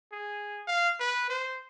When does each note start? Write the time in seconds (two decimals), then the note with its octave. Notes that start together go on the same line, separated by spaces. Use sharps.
0.12 G#4
0.67 F5
1.00 B4
1.30 C5